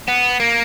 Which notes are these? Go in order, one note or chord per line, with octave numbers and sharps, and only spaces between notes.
B3
A#3